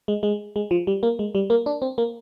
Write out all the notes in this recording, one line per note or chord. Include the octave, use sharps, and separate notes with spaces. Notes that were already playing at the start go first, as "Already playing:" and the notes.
G#3
G#3
G#3
F3
G3
A#3
G#3
G3
A#3
D4
C4
A#3